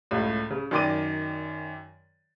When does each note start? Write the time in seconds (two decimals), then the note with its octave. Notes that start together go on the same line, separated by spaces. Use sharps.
0.11 C#2 A2
0.50 C#3
0.71 F#2 D#3 D5 G5 D6 D#7